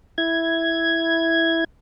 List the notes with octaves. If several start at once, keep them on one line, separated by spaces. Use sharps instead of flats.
E4 G#6